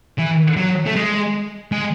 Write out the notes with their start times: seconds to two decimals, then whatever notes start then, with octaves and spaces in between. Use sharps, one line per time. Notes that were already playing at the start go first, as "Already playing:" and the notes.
0.19 E3
0.57 F#3
0.86 A3
0.95 G#3
1.72 G#3